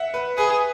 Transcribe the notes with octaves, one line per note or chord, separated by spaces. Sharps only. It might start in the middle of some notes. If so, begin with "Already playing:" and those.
Already playing: E5 F#5
B4
G#4 B4